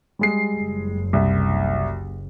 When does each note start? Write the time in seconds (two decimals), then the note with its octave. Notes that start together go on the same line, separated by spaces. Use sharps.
0.19 G3 G#3 C7
0.58 F#1
1.13 C2